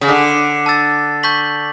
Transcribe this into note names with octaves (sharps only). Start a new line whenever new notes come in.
C#3
D3 D6 F#6 B6
A5 E6 A6
A5 C#6 G6 B6 F#7